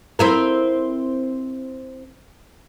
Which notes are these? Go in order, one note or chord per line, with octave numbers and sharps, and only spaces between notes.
C4 E4 A#4